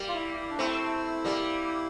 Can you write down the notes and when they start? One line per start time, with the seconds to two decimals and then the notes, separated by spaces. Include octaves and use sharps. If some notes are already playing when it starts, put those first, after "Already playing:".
Already playing: G3 A#3
0.08 F4
0.15 E4
0.36 E4
0.50 D4
0.58 A3 C4 E4
1.25 G3 A#3